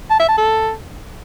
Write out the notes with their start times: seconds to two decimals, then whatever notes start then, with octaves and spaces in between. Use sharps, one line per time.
0.10 A5
0.20 E5
0.29 A5
0.38 A4